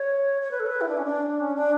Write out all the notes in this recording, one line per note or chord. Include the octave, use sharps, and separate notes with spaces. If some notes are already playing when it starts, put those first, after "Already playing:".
Already playing: C#5
C#5
B4
A4
B4
E4
D4
C#4
D4
C#4
D4